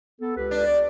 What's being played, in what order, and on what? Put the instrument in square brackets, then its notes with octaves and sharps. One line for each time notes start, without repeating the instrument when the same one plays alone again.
[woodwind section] B3 A4
C#2 G4 B4
[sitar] D4
[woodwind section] D5